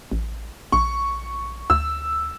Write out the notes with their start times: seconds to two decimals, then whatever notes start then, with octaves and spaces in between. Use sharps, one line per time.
0.11 A1
0.72 A#1 C#6
1.70 D2 E6